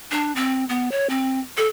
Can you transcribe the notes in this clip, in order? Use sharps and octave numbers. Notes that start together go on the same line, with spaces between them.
D4
C4
B3
C#5
C4
A4